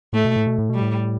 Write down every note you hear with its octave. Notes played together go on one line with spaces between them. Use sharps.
A2 A3
B2
A2
B2
A2
B2 G3
A2